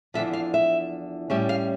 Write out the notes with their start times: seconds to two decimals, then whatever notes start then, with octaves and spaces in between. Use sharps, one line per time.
0.14 E2 D3 F3 E5
0.33 F5
0.54 E5
1.30 A2 G3 C#4 E5
1.49 F5